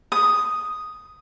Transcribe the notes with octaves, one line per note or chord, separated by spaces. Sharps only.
D#6